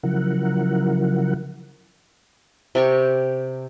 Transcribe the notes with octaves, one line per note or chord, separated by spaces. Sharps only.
C#3 F3 F#3 E4 A#4 F#5
C3 G4 C#6